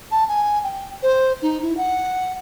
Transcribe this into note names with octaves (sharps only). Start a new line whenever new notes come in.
A5
G#5
G5
C5
D#4
E4
F#5